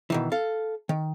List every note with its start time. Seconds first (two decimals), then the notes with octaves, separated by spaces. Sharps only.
0.10 B2 D#3 E3
0.32 A4 F5
0.89 D#3